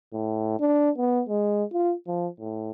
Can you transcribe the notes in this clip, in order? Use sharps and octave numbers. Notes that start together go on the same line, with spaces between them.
A2
D4
B3
G#3
F4
F3
A2